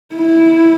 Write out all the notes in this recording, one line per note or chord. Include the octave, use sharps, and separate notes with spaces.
E4